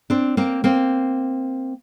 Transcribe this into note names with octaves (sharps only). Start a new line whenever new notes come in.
C4 D4
A#3 C4
A#3 C4